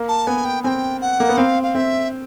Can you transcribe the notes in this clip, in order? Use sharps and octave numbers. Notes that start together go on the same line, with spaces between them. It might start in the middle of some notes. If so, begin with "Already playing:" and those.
Already playing: A#3
A5
B3 G#5
G5
C4 G5 G#5
F#5
A#3
B3
C4 F5
F5
C4 E5